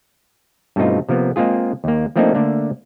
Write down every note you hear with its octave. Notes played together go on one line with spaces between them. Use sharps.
G2 B2 A3 C4 D#4 F4
C3 F3 A#3 B3
G#3 A#3 C4 F4 G#4
D#2 A#3
F3 A3 A#3 C4 D4 D#4
D3 A3 A#3 D4